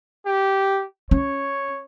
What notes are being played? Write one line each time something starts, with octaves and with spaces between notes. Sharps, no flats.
G4
C#4 C#5